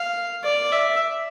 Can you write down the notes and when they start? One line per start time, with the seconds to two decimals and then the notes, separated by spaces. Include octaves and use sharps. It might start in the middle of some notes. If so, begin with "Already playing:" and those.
Already playing: F5
0.44 D5
0.72 E5